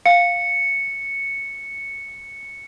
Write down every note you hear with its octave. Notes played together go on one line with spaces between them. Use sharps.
F5 C#7